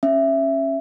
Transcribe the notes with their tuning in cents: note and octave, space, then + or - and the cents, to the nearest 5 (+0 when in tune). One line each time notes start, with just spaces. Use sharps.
C#4 -20 E5 +10